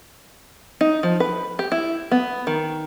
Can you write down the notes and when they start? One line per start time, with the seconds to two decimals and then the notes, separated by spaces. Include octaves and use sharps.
0.81 D#4
1.03 F3
1.20 B4
1.59 G4
1.72 E4
2.11 B3
2.47 D#3